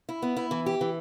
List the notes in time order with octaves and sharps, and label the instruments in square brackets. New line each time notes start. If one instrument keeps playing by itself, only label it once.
[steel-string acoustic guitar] E4
B3
E4
E3
G4
E3